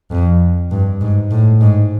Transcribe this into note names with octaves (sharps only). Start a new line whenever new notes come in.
F2
G2
G#2
A2
G#2